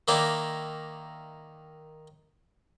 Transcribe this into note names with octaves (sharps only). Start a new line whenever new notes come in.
D#3 A#3 E4 D5